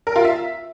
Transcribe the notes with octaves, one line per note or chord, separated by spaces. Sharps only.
A#4
F4
E5